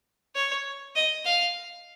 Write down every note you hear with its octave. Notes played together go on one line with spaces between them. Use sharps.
C#5
D#5
F5